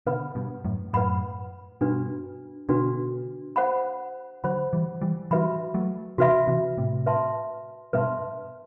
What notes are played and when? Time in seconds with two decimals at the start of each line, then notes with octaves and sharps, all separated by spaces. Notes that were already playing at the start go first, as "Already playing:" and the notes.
0.06 B2 D3 B4 F#5 B5
0.35 G2 B2
0.65 F#2 A2
0.93 F#2 A2 B4 F#5 B5
1.81 G2 B2 D4 F#4 B4
2.69 B2 D3 D4 F#4 B4
3.56 C5 F#5 B5
4.44 D3 F#3 C5 F#5 B5
4.73 E3 G3
5.01 E3 G3
5.31 E3 G3 F#4 B4 E5 B5
5.74 F#3 A3
6.18 C3 E3 F#4 B4 E5 B5
6.47 C3 E3
6.77 A2 C3
7.06 B4 E5 A5 C6
7.93 G2 B2 B4 E5 A5 C6